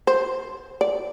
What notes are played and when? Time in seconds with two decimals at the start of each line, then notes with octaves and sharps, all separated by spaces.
0.07 C5
0.81 D5